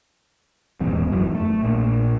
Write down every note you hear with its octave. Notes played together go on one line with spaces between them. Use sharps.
D#1 E2 G#2
F1 F#2 E3
A3
A#1 A#2